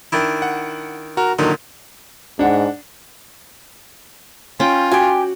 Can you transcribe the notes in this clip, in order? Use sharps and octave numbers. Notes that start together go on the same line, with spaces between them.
D#3 D4 E4
F#5
F#4 A#4 A#5
A#2 D3 D#3 F#3 D#4
G#2 D4 F#5
C#4 F4 G5
F#4 G4 G#5